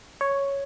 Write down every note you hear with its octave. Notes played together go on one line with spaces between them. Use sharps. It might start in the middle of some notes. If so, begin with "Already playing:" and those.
C#5